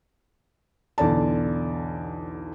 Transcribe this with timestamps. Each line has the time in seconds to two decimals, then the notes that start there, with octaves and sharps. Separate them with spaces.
0.98 B1 E2 D3 D5 A5